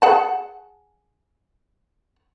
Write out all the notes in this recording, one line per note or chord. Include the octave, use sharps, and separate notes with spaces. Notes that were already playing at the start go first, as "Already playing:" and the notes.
G#4 F#5 A5